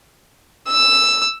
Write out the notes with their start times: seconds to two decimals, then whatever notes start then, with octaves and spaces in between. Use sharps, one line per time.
0.68 E6